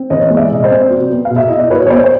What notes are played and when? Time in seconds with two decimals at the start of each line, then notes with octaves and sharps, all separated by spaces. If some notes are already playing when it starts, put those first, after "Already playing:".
Already playing: C4
0.10 E3 C#5 D#5
0.30 G#3
0.37 D5 E5
0.51 C3 D#5
0.64 C5 D5
0.71 C4
0.90 F#3
1.10 B3
1.25 F5
1.31 B2
1.36 E5
1.48 E4 D#5
1.59 D5
1.70 F#3 B4 C#5
1.87 C#5
1.90 B3 C5 D5
2.04 C5